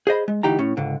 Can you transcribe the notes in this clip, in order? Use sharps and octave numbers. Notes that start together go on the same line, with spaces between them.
G#4 C5 D#5 B5
G#3
D2 E3 D#4 G4 A#5
A2 C#4
C#2 G#2 D3